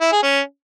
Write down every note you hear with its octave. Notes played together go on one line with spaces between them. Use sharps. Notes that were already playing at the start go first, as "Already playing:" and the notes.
E4
G#4
C#4